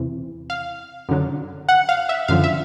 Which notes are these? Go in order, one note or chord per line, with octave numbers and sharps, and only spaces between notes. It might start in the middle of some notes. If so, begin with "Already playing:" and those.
Already playing: E2 C3 E3
F5
F#2 D3 F#3
F#5
F5
E5
F#2 D3 F3 F5
E5